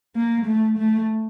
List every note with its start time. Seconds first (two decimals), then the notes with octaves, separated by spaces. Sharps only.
0.16 A#3
0.47 A3
0.78 A3